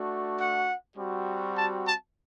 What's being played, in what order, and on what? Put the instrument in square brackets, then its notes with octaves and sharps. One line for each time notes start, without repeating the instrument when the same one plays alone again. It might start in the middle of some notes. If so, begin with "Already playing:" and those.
Already playing: [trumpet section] A3 D4 F#4
F#5
G3 C4 F#4
A5
A5